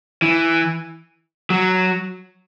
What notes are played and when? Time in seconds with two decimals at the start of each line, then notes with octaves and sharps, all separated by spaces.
0.22 E3
1.50 F#3